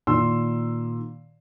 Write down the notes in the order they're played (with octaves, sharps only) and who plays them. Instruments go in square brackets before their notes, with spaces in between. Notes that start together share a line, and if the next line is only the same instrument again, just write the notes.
[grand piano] A#2 D#3 C6 E6